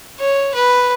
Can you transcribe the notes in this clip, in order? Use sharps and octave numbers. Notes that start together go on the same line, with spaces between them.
C#5
B4